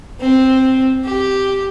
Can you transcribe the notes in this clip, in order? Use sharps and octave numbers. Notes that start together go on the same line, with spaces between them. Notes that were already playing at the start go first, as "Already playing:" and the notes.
C4
G4